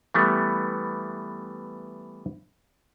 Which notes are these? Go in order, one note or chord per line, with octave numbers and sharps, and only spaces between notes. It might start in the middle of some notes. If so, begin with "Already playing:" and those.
E3 G3 A3 B3